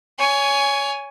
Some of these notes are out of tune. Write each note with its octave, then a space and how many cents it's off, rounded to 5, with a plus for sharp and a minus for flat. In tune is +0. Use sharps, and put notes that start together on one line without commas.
C#5 +20 G#5 +0